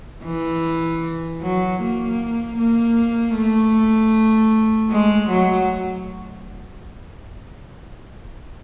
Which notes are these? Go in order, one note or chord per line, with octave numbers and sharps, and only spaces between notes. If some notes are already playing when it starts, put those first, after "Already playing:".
E3
F#3
A#3
A#3
A3
G#3
F#3